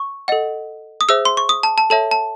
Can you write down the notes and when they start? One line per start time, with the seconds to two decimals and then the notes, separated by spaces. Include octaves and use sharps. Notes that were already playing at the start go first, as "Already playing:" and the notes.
Already playing: C#6
0.28 A4 D#5 F#5
1.01 D#6
1.09 G#4 C5 E5 E6
1.25 C6
1.37 C#6
1.49 D#6
1.63 A5
1.78 A5
1.90 A4 C#5 E5 A5
2.11 A5